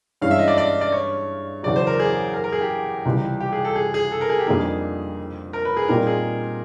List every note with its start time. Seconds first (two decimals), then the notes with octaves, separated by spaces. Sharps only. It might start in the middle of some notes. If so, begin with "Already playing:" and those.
0.21 G2 E3 G#3 C#4 F5
0.31 E5
0.39 D#5
0.48 D5
0.58 D5
0.81 D5
0.92 C#5
1.63 E2 C#3 F#3 D5
1.76 C5
1.87 A#4
1.99 G#4
2.34 A#4
2.44 A#4
2.52 G#4
2.61 G4
3.05 C#2 C3 E3 G3
3.40 G4
3.52 G#4
3.65 A4
3.76 G#4
3.94 G#4
4.12 A4
4.21 A#4
4.30 G#4
4.39 G4
4.47 F2 D3 G3 A#3 D#4 G#4
5.53 A#4
5.65 B4
5.77 G#4
5.88 A#2 G3 C4 D#4 A#4
6.07 G#4